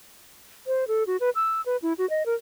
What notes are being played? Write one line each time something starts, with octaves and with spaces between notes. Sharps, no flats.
C5
A4
F#4
B4
E6
B4
E4
F#4
D#5
A#4